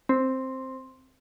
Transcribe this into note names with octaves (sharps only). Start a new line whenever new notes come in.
C4